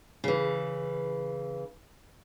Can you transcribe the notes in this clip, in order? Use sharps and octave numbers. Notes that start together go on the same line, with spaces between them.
C#3 E3